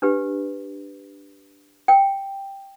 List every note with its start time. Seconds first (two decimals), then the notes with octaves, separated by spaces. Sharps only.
0.02 D4 G4 B4
1.88 G5